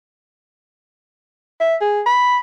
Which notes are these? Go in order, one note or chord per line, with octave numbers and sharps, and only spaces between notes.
E5
G#4
B5